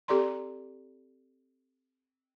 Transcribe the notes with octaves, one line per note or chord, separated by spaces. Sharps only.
C4 G4 A4 D5 A#5 C6